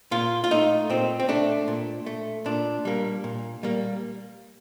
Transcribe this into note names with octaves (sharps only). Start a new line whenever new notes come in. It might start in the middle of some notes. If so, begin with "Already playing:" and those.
A#2 F4
F4
A3 D#4
A#2 C4
C4
A3 D4
A#2
A3
A#2 D4
G3 A#3
A#2
G3 A#3